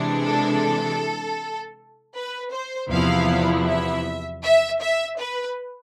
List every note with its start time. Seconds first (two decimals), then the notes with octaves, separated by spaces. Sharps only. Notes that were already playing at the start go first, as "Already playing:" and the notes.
Already playing: C3 E3 G#3 D4
0.23 A4
2.14 B4
2.52 C5
2.90 E2 C3 F3 B3 E4 F5
3.67 E5
4.42 E5
4.80 E5
5.18 B4